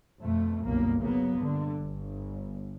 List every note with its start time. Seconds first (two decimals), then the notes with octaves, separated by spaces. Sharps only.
0.21 F2 B2 A3
0.64 G1 C2 F#2 B2 A#3 B3
1.01 C#3 F#3 A#3 B3
1.38 G2 D3
1.76 G1